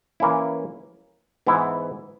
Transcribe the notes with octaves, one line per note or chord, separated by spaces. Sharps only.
E3 A#3 C#4 E4
G#2 E3 B3 E4